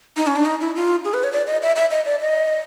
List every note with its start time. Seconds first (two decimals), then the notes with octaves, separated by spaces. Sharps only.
0.17 D#4
0.27 C#4
0.36 D4
0.45 D#4
0.61 E4
0.76 F4
1.04 G#4
1.14 B4
1.24 C#5
1.32 D5
1.47 D#5
1.62 E5
1.76 E5
1.91 D#5
2.05 D5
2.20 D#5